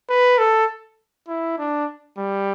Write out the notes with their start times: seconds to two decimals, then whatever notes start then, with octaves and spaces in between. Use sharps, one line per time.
0.10 B4
0.39 A4
1.28 E4
1.59 D4
2.18 G3